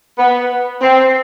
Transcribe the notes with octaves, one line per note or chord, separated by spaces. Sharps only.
B3
C4